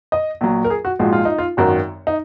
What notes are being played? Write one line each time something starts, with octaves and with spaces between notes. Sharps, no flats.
D#5
A#1 A#2 F#3
A#4
G#4
F#4
A#1 G#2 F3 G#3 F#4
F4
D#4
F4
G#1 F#2 D#3 F#4
D#4